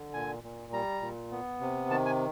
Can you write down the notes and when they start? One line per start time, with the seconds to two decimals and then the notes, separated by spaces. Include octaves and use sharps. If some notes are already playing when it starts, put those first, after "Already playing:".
Already playing: D3
0.14 A#2 G#5
0.43 A#2
0.73 G3 A#5
1.02 A#2
1.31 B3
1.61 C3
1.90 D#3 A5
2.06 G#5